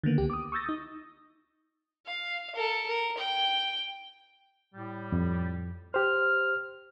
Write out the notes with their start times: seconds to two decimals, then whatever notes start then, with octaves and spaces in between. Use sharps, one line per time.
0.03 D3 D#3 A#3 B3
0.18 C#2 G4
0.30 D6 D#6
0.52 C#6 D#6 E6 G6 A6 A#6
0.66 D#4 D#6
2.05 F5
2.55 A4 A#4
2.87 A#4
3.17 G5
4.75 A2 G3
5.12 F2
5.94 G4 C5 F6